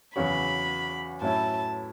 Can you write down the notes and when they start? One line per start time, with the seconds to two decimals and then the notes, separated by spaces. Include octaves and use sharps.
0.16 E2 C#3 F#3 C#4 F#4 B5
1.22 A2 F#3 C#4 E4 A5